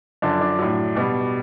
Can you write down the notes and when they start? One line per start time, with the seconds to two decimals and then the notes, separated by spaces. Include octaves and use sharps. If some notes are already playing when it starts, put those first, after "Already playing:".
0.22 F#2 D3 F3 D4
0.41 D4
0.59 A2 F#3
0.95 B2 G3